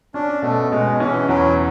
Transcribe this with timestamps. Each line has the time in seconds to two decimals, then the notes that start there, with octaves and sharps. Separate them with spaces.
0.14 C#4 D4
0.42 B2 A3
0.71 B2 G#3
1.00 E3 C#4
1.28 E2 F#3